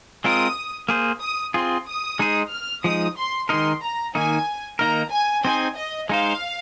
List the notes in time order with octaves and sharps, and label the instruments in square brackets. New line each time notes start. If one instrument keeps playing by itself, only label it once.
[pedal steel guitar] G#3 C4 F4 A#4 [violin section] D#6
[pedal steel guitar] A#3 G#4 C5
[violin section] D#6
[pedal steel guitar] C4 F4 G#4 [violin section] C6
[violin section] D#6
[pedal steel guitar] G#3 D#4 G#4 C5
[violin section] F6
[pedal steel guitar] F3 G#3 D#4 [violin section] D#6
[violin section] C6
[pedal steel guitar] D#3 G#3 D#4 A#4 [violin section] C6
[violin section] A#5
[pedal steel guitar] D#3 A#3 D#4 [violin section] G#5
[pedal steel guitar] D#3 A#3 D#4 A#4 [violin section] A#5
[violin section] G#5
[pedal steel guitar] C4 D#4 G#4 C5 [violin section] G#5
[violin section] D#5
[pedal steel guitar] G#3 D#4 C5 [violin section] F5